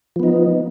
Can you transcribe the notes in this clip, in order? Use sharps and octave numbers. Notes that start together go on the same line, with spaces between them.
F3 B3 D#4